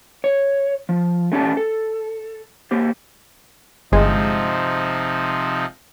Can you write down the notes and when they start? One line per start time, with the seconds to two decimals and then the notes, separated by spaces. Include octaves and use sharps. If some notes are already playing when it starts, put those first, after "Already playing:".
0.24 C#5
0.89 F3
1.32 A3 C#4 G4 D5 A5
1.57 A4
2.71 A#3 G4 C5
3.92 G1 C3 F3 G#3 D#4